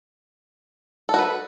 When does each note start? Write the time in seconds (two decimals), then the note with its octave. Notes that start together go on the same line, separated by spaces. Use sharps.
1.09 A4
1.14 F#4
1.19 B4